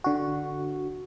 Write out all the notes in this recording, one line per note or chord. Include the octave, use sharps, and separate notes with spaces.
D3 F#4